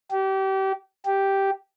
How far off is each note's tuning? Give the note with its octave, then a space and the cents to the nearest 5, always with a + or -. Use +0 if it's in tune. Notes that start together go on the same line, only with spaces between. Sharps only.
G4 -30
G4 -5